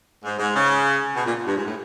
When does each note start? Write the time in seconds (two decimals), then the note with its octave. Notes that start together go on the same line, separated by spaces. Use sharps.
0.23 G#2
0.39 G#2
0.54 C#3
1.15 B2
1.25 A#2
1.46 G2
1.56 G#2
1.65 A2